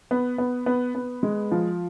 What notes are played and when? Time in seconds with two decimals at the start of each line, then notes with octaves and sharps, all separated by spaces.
0.11 B3
0.38 B3
0.66 B3
0.95 B3
1.23 G#3
1.52 F3